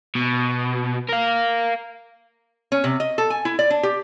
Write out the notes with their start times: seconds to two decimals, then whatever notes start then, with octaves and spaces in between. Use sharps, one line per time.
0.15 B2
1.09 A#4 F5
2.72 C#4
2.84 C3
3.00 D#5
3.18 A4
3.30 G#5
3.45 E4
3.59 D5
3.70 D4
3.83 G4